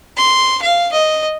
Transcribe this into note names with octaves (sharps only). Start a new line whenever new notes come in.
C6
F5
D#5